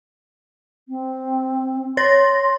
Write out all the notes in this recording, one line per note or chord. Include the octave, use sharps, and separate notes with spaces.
C4
C#5 C6 A6 A#6